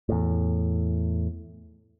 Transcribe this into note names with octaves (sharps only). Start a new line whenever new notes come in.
E2 A2